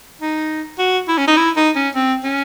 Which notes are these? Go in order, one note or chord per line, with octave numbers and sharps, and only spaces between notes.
D#4
F#4
E4
C#4
D#4
E4
D#4
C#4
C4
C#4